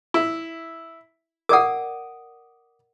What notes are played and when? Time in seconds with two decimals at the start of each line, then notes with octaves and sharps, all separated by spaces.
0.14 E4
1.49 A#4 D5 F#5 D6 D#6